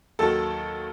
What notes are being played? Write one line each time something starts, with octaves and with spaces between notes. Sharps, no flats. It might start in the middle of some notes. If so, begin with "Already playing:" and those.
D#2 D#3 F#3 A4